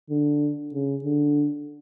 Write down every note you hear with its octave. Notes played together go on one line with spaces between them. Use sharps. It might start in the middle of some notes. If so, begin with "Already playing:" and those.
D3
C#3
D3